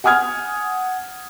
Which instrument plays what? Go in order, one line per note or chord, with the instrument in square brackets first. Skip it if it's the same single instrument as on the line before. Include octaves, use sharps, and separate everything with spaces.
[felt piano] F#5 G#5 D#6 F6 G#6